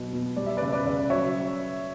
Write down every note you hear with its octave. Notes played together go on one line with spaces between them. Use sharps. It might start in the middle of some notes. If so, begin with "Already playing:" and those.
Already playing: B2 F#3
B2
G3 D5
E5
C#3 B4 D5
B4 D5
C#3
F#3 C#5 E5